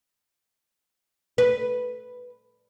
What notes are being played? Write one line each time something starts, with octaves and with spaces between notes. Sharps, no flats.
B4